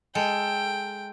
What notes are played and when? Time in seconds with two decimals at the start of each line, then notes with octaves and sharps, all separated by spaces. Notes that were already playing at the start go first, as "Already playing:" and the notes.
0.15 G#3 A4 G5